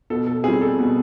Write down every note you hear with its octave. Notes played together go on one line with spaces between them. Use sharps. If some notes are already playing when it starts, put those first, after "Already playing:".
B2 A4
A4
G3 C4 G#4
A4
B2